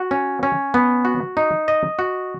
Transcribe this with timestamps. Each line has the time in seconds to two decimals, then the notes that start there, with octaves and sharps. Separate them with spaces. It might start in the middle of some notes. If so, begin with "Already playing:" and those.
Already playing: F#4
0.11 C#4
0.43 C#4
0.74 B3
1.05 F#4
1.37 D#4
1.68 D#5
1.99 F#4